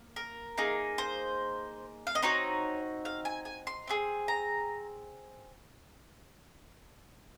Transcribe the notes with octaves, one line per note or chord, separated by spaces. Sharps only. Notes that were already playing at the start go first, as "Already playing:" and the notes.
Already playing: A#3
A#4
A#3 D#4 G#4
C5
F5
D#5
C4 D#4 F#4 C#5
F5
G#5
G#5
C6
C4 F4 G#4
A#5